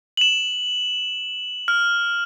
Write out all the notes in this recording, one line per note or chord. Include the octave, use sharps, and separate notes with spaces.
E7 F#7
F6